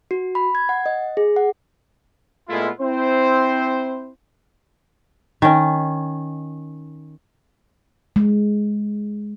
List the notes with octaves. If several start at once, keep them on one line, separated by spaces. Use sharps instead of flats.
F#4
B5
G#6
F#5
D#5
G#4
F#5
A#2 G#3 A3 B3 E4 F4
C4 E4 C5
D#3 C#4
G#3